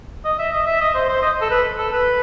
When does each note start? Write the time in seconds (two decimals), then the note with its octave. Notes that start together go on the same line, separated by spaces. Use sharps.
0.25 D#5
0.39 E5
0.53 D#5
0.67 E5
0.81 D#5
0.94 C5
1.09 C5
1.22 D#5
1.41 A4
1.51 B4
1.78 A4
1.93 B4